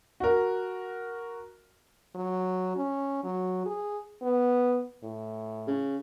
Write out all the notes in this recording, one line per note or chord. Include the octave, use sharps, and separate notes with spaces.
F#4 A#4
F#3
C#4
F#3
G#4
B3
A2
C#3